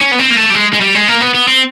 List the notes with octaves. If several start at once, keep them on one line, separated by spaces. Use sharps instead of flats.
C#4
B3
C4
A#3
A3
G3
G#3
G#3
G3
G#3
A#3
B3
B3
C4